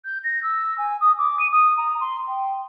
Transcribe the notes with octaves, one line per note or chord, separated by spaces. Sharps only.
G6
A#6
E6
G#5
D#6
D6
D#7
D#6
A#5
C6
G5